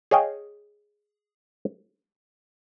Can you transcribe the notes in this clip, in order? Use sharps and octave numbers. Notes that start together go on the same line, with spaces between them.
G#4 C#5 D#5 F5 G5